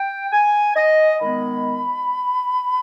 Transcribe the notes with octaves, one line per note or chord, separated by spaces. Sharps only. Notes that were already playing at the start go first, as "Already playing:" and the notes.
Already playing: G5
G#5
D#5
D#3 G#3 B3 B5